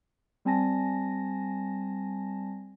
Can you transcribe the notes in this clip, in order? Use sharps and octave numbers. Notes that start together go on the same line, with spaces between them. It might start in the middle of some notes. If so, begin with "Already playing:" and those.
G3 C4 G#5 A5 A#6